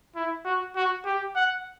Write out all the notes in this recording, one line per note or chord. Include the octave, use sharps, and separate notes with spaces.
E4
F#4
F#4
G4
F#5